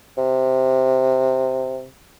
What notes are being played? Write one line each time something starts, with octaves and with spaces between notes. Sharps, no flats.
C3